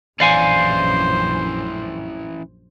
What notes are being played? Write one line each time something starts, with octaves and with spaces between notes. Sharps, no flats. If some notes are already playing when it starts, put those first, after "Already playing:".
A#1 F#2 E3 C#4 C5 D5 F5 G#5